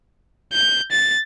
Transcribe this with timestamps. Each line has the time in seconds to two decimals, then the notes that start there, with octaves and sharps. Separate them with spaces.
0.52 G6
0.91 A6